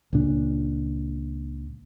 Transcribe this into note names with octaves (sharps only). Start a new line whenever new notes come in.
C#2 A#2 D4